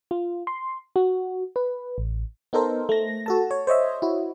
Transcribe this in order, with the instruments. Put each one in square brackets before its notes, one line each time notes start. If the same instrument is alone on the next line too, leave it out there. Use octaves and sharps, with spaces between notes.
[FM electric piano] F4
C6
F#4
B4
A1
B3 D#4 A4 A#4 C5
A3 A#6
F#4 A4 A5
C#5
C5 C#5 D#5 E5
E4 F#4